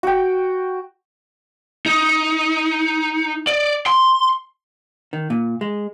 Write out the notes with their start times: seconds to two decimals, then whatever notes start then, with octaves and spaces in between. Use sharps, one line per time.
0.03 F#4 G5
1.86 D#4
3.47 D5
3.87 C6
5.13 D#3
5.30 A#2
5.61 G#3